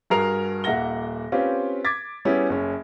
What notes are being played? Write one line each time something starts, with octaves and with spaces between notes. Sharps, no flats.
G2 F#4 G#4 A#4 C7 F7
D#1 A#3 E5 F#5 A#6 G7
C4 C#4 F4 G4 B4
D6 G#6 A6 B6
G3 B3 C#4 E4 G4 G#4
F#1 C#4